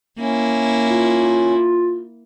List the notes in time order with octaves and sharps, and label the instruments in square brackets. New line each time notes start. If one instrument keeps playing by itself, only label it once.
[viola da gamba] A#3 E4 [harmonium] C#4
[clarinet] F4